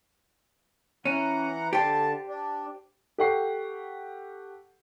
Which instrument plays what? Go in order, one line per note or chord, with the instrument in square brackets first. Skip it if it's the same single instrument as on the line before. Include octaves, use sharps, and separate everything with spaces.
[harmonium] E3 F#5 A#5 [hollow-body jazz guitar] C#4
[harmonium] D3 A5 [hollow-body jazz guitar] G4 C5
[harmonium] D4
[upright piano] G4 A4 F#5 C#6 C7